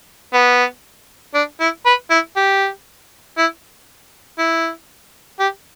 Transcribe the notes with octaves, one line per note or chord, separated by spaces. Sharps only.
B3
D4
E4
B4
E4
G4
E4
E4
G4